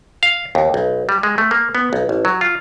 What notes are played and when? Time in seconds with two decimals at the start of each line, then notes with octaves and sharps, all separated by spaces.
0.23 F5
0.55 D#2
0.74 B1
1.09 G3
1.23 G#3
1.38 A3
1.51 A#3
1.75 B3
1.93 B1
2.09 A1
2.25 F#3
2.41 F4